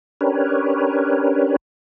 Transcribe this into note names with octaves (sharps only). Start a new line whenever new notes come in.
C#4 D4 G4 A#4 B4 C#5